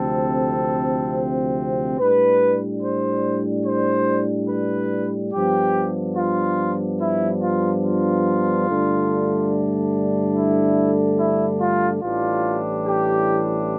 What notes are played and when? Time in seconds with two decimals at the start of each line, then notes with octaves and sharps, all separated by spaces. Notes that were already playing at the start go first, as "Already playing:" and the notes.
Already playing: D2 C3 F3 C4 A4
1.99 A2 G3 D4 B4
2.83 C5
3.66 C5
4.49 B4
5.33 G2 F3 B3 D4 G4
6.17 F4
7.01 E4
7.42 F4
7.84 F4
8.68 G2 D3 A3 D4
10.35 E4
11.19 E4
11.60 F4
12.02 A1 A2 E3 G3 D4 F4
12.86 G4